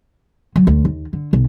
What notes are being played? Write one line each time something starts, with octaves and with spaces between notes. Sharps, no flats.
F#3
D2
D#2
D3
B1